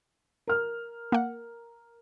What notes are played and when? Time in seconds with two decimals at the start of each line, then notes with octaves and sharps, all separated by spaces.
0.47 A#4 F6
1.12 A#3 F#5